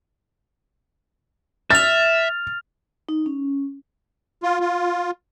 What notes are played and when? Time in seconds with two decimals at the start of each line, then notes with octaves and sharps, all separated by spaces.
1.71 E5 F6 A6 F7
3.09 D#4
3.26 C#4
4.43 F4
4.60 F4